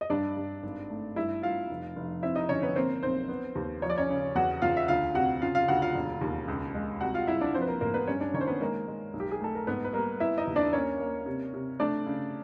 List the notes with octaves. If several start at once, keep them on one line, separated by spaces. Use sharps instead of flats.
D#5
G2 D4 D5
G2
G#1
A3
G2 E4 E5
G2 F4 F5
F1
F1
C4 E4 E5
D#4 D#5
D3 C#4 C#5
B3 B4
A#3 C4 C5
B1 C4 C5
B3
D#2
F3 C#5
D5
C#4 C#5
C#3
E2 F#4 F#5
E2 F4 F5
E5
D2 F4 F5
C3 F#4 F#5
C#3 F4 F5
F4 F5
D2 F#4 F#5
F4 F5
E1
D#2
C#2
G#3
C2 F#4 F#5
F4 F5
C2 E4 E5
D4 D5
F3 C4 C5
B4
A#3 A#4
A2 A#3 A#4
B3 B4
G2 C#4 C#5
D4 D5
D#3 C#4 C#5
C5
B3 B4
G#3 A#3 A#4
G#3
B1
G4
G#4
A3 A4
A#4
G#2 B3 B4
B4
G3 A#3 A#4
B3 E4 E5
D#4 D#5
D#2
D4 D5
A#3 C#4 C#5
A#3
C3
C3
A3 D4 D5
C#3